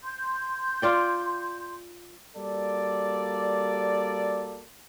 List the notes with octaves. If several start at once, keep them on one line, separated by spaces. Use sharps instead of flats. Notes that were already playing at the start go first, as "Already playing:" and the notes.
C6 G6
F4 D5 G5
G3 A#3 F#4 A4 D5